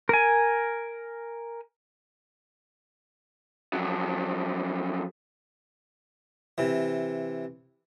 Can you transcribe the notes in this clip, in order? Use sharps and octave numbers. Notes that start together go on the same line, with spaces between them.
A#4 G#5
F2 F#3
C3 E3